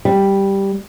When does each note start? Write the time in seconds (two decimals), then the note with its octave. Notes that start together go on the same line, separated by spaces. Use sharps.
0.05 G3